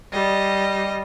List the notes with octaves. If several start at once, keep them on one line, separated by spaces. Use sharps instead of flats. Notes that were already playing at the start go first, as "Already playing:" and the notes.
G3 D#5